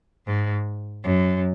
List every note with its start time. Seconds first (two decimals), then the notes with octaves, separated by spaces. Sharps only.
0.26 G#2
1.04 F#2